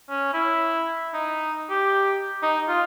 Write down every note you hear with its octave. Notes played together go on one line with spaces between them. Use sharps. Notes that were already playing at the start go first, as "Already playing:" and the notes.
C#4
E4
D#4
G4
D#4
F4